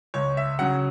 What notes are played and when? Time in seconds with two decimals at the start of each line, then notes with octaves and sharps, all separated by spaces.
0.14 C#2 C#5
0.37 E5
0.59 C#3 F#3 C#4 F#5